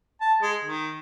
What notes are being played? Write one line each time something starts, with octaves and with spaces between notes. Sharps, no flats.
A5
G#3
D#3